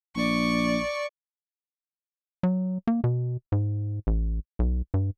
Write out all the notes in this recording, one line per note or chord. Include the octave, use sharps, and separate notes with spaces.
A#1 D5 C#6
F#3
A#3
B2
G#2
A1
B1
G2